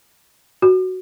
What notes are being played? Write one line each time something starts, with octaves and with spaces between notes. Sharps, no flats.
F#4